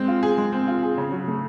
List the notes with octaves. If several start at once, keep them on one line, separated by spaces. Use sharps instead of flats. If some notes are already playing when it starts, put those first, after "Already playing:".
Already playing: G#3 C4
F4
G#4
G#3
C4
F4
G#4
C#3
F#3
A3